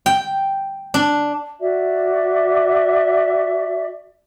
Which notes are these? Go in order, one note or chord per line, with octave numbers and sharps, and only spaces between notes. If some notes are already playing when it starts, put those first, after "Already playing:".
G5
D4
F#4 D5 E5